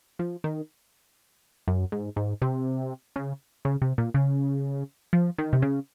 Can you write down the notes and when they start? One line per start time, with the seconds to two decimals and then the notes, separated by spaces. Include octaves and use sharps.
0.19 F3
0.44 D#3
1.68 F#2
1.92 G#2
2.16 G#2
2.42 C3
3.16 C#3
3.65 C#3
3.82 C3
3.98 A#2
4.14 C#3
5.13 F3
5.38 D#3
5.53 C3
5.62 C#3